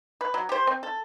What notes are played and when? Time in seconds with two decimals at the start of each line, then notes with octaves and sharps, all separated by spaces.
0.21 B4
0.34 F#3
0.49 G4 C5
0.67 C4
0.83 A4